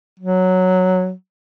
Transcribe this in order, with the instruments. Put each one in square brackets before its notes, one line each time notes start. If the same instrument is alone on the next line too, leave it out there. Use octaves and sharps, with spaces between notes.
[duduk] F#3